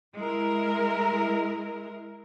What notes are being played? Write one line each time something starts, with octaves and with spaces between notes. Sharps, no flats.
G#3 E4 A#4